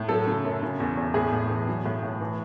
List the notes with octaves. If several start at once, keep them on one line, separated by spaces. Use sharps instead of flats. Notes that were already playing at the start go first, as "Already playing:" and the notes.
Already playing: A2
F#3 A4
C#3
F#2
C#3
E2
E2
A2 G#4
A2
E3
F#3
A2
A2
E3